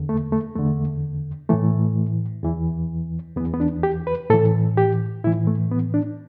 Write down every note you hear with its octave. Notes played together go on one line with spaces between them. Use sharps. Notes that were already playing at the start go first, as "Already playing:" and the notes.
Already playing: E2 D3
A3
A3
E2 D3 A3
A2 E3 A3
E2 E3
E2 E3 B3
B3
D4
G4
B4
A2 E3 A4
G4
A2 E3 E4
A3
B3
D4